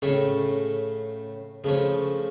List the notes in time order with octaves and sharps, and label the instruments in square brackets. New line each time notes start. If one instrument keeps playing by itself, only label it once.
[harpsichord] A2 A3 C#4 A4 [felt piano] C#3
[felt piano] C#3 [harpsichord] F3 A3 C#4